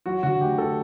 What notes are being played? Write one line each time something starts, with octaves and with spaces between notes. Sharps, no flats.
F#3 F#4
D3 F#4
D2 G4
D2 A4